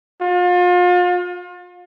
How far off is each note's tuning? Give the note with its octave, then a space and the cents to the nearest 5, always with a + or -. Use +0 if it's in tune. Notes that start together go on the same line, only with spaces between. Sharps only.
F4 +35